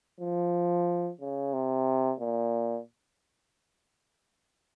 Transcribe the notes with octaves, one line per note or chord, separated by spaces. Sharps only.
F3
C#3
C3
A#2